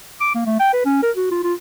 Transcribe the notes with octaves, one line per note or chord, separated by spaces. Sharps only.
D6
A#3
A3
G5
B4
C#4
A#4
F#4
F4
F4